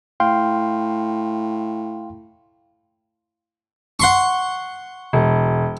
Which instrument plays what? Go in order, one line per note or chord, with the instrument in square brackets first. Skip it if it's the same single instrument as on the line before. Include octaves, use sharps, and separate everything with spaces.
[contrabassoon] A2 [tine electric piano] F5 G5 C6
[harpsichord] F#5 C6 C#6
[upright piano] E1